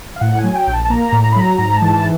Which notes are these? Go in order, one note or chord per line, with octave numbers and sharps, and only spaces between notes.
F5
A2 F#5
G#5
F#3
G5
A#1
A5
A5
A#3 A#5
A2
A#5
B5
F#3 A#5
G#2 A#5
A5
E3
A5